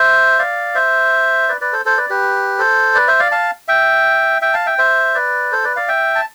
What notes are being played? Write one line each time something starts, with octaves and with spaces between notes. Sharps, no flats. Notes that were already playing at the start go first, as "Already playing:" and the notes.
Already playing: C5 E5
D5 F5
C5 E5
B4 D5
B4 D5
A4 C5
A4 C5
B4 D5
G4 B4
A4 C5
B4 D5
C5 E5
D5 F5
F5 A5
E5 G5
E5 G5
F5 A5
E5 G5
C5 E5
B4 D5
A4 C5
B4 D5
D5 F5
E5 G5
A5